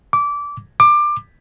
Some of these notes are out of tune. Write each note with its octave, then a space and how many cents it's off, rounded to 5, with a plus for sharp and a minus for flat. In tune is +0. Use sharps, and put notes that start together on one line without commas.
D6 -20
D6 +20